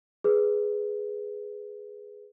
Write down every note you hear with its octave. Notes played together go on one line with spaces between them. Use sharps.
G#4 B4